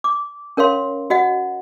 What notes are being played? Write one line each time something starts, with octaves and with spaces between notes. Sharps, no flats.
D6
C#4 A#4 C#5 F5 C6
F#4 D#5 F#5